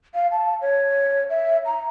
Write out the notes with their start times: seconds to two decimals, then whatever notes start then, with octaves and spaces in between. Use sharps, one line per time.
0.15 F5
0.32 A5
0.62 C#5
1.30 E5
1.66 A#5